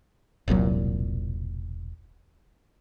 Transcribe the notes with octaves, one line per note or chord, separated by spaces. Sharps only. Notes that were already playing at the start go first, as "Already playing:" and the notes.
E1 C2 A#2 F#3